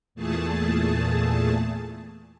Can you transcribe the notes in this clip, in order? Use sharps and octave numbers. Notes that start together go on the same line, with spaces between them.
E2 A#2 A3 G#4 A5